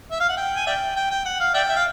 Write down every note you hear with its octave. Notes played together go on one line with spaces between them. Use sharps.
E5
F5
F#5
G5
G#5
D5 E5 G5
G5
G5
F#5
F5
D5 E5 G5
E5
F5